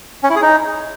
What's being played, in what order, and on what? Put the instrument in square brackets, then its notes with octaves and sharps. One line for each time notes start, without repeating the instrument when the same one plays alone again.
[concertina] C#4
E4
G#4
D#4